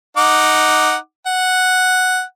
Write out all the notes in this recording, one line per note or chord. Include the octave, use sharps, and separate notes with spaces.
D#4 F#5 D6
F#5